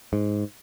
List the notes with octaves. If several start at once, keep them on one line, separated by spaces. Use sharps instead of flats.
G#2